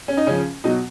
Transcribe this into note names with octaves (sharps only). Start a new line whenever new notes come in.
C#4
D#4
C#3 F3 C#4
B2 F#3 D#4